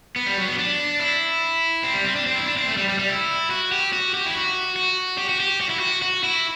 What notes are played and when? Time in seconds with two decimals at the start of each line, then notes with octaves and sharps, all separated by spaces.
0.16 B3
0.26 G3
0.37 F#3
0.48 B3
0.58 D4
1.00 E4
1.83 C4
1.94 G3
2.04 C4
2.16 D4
2.26 C4
2.35 E4
2.46 D4
2.57 C4
2.68 A3
2.77 G3
2.89 G3
2.99 G3
3.09 E4
3.50 F#4
3.72 G4
3.93 F#4
4.14 G4
4.26 E4
4.34 F#4
4.76 F#4
5.18 G4
5.29 F#4
5.40 G4
5.61 F#4
5.70 E4
5.80 F#4
6.02 F#4
6.24 E4